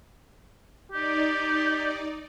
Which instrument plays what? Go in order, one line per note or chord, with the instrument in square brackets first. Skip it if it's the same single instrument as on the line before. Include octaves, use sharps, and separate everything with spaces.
[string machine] D#4 D5 [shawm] G4